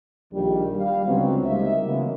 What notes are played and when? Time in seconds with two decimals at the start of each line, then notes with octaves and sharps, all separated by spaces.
0.33 A#1 D#3 G3
0.77 G3 F5
1.06 C#2 D3 F#3 B3 C4
1.45 G3 G#3 A#3 D#4 E5
1.85 C#3 E3 F#3 G#3 A#3 B3